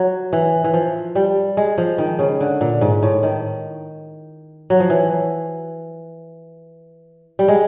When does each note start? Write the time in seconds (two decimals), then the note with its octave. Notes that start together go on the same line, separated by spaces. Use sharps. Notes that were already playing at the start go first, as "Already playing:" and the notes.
Already playing: F#3
0.33 E3
0.64 E3
0.74 F3
1.15 G3
1.57 G#3
1.78 F3
1.98 D#3
2.19 C#3
2.41 D3
2.61 A#2
2.81 G#2
3.03 A2
3.23 D#3
4.70 F#3
4.80 F3
4.90 E3
7.39 G3
7.48 G#3